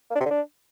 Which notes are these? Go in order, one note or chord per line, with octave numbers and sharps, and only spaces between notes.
A#3
D4
C3
D3
D4